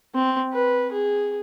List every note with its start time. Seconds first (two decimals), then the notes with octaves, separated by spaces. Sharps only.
0.15 C4
0.53 B4
0.92 G#4